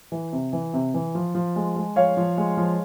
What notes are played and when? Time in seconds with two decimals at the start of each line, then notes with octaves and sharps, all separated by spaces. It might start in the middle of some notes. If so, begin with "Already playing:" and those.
0.12 E3
0.33 C3
0.53 E3
0.74 C3
0.94 E3
1.15 F3
1.35 F3
1.56 G#3
1.76 G#3
1.96 F3 C#5 F5
2.17 F3
2.38 G#3
2.57 F3